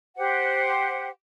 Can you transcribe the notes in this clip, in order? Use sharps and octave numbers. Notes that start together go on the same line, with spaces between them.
G4 C5 F#5